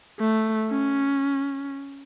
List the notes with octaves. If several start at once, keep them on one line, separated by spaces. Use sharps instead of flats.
A3
C#4